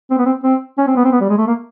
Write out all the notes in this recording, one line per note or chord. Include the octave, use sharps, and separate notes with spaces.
C4
B3
C4
C4
C#4
C4
B3
C4
B3
G3
G#3
A3
A#3